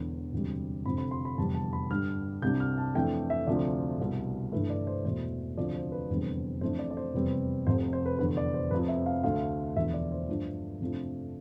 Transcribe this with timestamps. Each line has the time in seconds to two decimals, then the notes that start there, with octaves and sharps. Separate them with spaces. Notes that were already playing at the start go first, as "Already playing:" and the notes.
Already playing: E1 E2 D3
0.32 E1 D2 C3 G3
0.86 F1 F2 D3 F3 C4 B5
0.98 B5
1.11 C6
1.25 B5
1.38 F1 E2 D3 G3 D4 A5
1.54 A5
1.73 B5
1.90 G2 D3 G3 F6
2.42 C2 C3 G3 D4 G6
2.60 F6
2.78 A5
2.95 F2 E3 A3 D4 G5
3.30 E5
3.47 D2 C3 F3 A3 D4 D5
3.99 C2 B2 G3
4.52 G1 G2 E3 A3 B4
4.70 D5
4.87 C5
5.04 E1 E2 B2 A3 C5
5.57 D2 C3 F3 D5
5.74 C5
5.92 B4
6.10 F1 E2 D3 G3 C4
6.61 F2 E3 A3 D4 C5
6.79 D5
6.90 D5
6.97 C5
7.14 F1 E2 C3 G3 C4 B4
7.67 F1 F2 C3 C5
7.93 C5
8.06 B4
8.19 F1 E2 D3 B4
8.37 D5
8.54 C5
8.71 F1 F2 C3 F3 B4
8.88 E5
9.06 F5
9.24 D2 D3 A3 F5
9.76 E1 E2 D3 F3 E5
9.94 D5
10.12 C5
10.29 G2 F3 A3 D4
10.80 F2 C3 F3 A3 D4